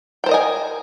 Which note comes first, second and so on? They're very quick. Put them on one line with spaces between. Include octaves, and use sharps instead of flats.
G5 C5 A#4 D#5 G#5